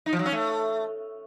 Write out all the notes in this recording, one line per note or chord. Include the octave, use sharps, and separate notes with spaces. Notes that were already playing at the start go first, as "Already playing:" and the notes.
D#4
F3
F#3
C#4
A3